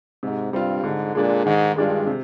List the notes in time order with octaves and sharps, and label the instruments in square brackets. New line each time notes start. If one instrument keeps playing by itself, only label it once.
[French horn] G#2 [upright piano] C3
[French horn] G2 [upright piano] G3 C4 F4
[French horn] G#2 [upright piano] D3
[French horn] A#2 [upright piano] G#3 D4
[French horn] G#2 [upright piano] D#3
[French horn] G2 [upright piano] G#3 D4 F4
[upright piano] C3